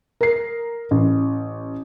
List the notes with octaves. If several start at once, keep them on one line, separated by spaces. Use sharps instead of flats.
A#4 C7
A1